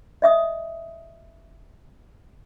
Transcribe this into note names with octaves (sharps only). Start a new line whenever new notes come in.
D#5 E5 D#6